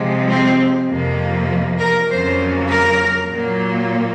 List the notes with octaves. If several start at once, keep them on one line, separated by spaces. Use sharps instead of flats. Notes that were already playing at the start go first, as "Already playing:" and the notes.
Already playing: C3 F3 G#3
C4
F2 C3 F3 A#3
A#4
F2 C#3 F#3 A#3 C5
A#4
A#2 F#3 A#3